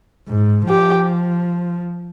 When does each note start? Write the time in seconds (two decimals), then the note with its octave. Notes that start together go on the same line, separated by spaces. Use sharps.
0.28 G#2
0.69 F3 G4